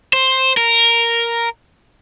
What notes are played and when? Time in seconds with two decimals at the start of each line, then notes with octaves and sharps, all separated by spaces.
0.13 C5
0.57 A#4